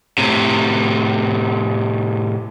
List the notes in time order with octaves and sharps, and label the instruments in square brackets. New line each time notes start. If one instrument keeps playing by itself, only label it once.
[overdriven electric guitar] A2 C3